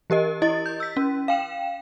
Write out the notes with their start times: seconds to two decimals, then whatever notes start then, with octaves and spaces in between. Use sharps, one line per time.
0.10 E3 G4 A#4 D#5
0.42 E4 D#5 A6
0.66 G6
0.80 E6 B6
0.97 C#4
1.28 F5 G5 E7